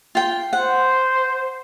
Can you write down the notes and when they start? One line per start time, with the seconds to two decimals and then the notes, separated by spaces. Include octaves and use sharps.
0.15 F4 G5
0.53 C5 F#5